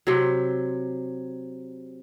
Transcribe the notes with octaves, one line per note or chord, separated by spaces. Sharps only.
C3 F#3